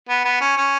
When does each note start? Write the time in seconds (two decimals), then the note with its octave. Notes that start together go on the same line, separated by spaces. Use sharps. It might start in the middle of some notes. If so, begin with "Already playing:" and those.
0.09 B3
0.25 B3
0.41 C#4
0.57 C#4